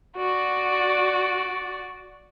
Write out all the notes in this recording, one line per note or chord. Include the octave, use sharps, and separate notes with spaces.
F#4 D5